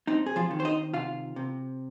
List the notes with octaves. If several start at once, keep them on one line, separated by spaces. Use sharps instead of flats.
C4 D#4
G#4
F3 F4
D#3
C5
D#4 D#5
C3 F4 F5
C3